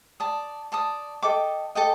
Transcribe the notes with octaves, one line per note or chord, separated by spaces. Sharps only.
D5 A5 D#6
D5 A5 D#6
A4 D#5 G5 D6
A4 D#5 G5 D6